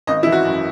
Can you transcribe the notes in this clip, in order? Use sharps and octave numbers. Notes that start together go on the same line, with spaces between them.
G#1 D#5
E3 E4
F#4
F#2